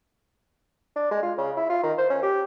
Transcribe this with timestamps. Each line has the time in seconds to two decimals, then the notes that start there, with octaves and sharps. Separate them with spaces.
0.95 D4
1.11 G#3
1.22 F4
1.38 C#3
1.56 E4
1.70 F4
1.83 D#3
1.98 C5
2.10 C#4
2.22 G4